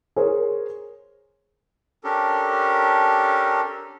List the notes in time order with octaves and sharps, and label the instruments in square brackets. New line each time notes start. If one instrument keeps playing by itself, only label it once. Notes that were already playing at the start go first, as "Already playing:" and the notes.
[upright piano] G#4 A#4 C5 C#5
[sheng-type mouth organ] C#4 D4 G4 A4 A#4